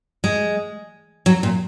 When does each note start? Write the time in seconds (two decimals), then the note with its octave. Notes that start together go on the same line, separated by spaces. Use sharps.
0.24 G#3
1.26 F#3
1.43 A#2